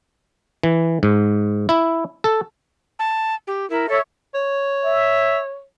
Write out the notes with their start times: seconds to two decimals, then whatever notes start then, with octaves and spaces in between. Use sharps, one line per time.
0.63 E3
1.03 G#2
1.69 E4
2.24 A4
2.99 A5
3.47 G4
3.70 E4 A#4
3.89 A4 C#5 E5
4.34 C#5
4.85 E5